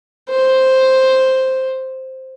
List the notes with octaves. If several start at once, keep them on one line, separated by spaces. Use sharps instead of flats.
C5